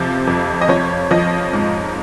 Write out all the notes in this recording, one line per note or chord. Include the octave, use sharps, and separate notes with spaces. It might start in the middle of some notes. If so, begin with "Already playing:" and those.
Already playing: F2 C3 F3
F2
D#5
F3 C#5
F3 D#5
G#2